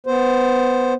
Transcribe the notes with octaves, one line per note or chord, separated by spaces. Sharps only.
B3 C5